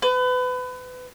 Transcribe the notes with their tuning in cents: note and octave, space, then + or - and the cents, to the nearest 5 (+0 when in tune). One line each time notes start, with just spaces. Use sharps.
B4 +30